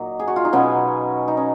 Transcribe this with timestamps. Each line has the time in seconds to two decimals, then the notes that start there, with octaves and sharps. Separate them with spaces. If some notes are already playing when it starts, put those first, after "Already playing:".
Already playing: A#2 F#3 D#4
0.20 G#4
0.28 F#4
0.36 F4
0.45 D#4
0.53 B2 F#3 B3 C#4
1.28 D#4
1.37 C#4